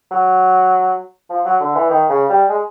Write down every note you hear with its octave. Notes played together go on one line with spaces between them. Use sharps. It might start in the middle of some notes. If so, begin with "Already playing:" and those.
F#3
F3
F#3
D3
E3
D#3
C#3
G3
G#3